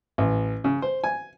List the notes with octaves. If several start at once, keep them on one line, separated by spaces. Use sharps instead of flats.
A1
C#3
C5
G#5